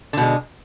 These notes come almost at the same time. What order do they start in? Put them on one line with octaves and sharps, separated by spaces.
D3 B2 G#3